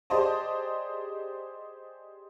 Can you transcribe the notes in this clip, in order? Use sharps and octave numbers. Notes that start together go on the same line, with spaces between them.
G4 G#4 C5 D5 D#5 A5